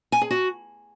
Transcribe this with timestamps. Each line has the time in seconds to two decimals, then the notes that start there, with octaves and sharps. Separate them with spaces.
0.12 G#5
0.21 G#4
0.31 F#4